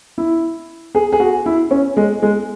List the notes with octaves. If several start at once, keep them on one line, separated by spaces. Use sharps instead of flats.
E4
G#4
G#4
F#4
E4
C#4
G#3
G#3